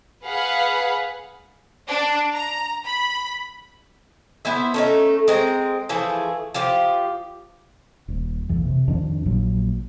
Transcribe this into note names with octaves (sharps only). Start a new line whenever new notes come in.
G#4 B4 F5 F#5 B5
D4
A#5
B5
B3 E4 C5 E5
A3 C#4 D#4
G#3 C4 A#5
E3 F3 A3 G#4
F3 F4 G4
D#1
A#1 F2 E3
C3
F2 A2 D#3 D4
A#1 A#2 F#3